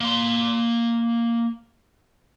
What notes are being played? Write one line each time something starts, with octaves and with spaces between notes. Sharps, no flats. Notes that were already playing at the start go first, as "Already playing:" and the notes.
A#3 C6